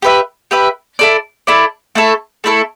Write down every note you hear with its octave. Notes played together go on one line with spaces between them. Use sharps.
G4 B4 E5
G4 B4 E5
E4 A4 D5
E4 A4 D5
A3 E4 A4
A3 E4 A4